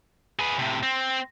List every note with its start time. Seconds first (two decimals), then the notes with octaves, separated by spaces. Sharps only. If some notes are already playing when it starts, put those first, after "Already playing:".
0.39 G#4 B4
0.59 A2 C3
0.83 C4